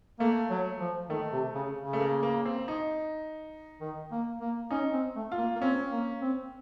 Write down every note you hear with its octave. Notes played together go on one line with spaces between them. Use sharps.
A3 A#3
F#3
F3
D#3 A3
C3
C#3
C#3
A3
A#3
A#3
C4
D#4
D#3
A#3
A#3
C#4 D#4
C4
A3
F4
A#3
A#3
C4 C#4
A#3
C4